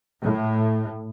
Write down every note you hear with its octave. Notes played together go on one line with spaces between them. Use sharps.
A2